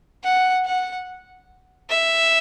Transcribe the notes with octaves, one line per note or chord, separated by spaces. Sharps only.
F#5
F#5
E5